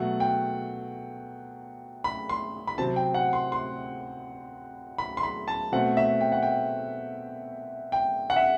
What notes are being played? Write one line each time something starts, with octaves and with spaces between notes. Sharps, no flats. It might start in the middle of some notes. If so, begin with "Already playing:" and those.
Already playing: B2 F#3 A3 F#5
G5
B5
C6
B5
C3 F#3 C4 A5
G5
F#5
C6
C6
B5
C6
B5
A5
B2 A3 C4 F#5
E5
G5
F#5
G5
G5
F#5
E5